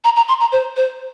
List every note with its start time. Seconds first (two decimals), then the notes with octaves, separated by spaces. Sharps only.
0.04 A#5
0.16 A#5
0.28 C6
0.40 A#5
0.52 C5
0.76 C5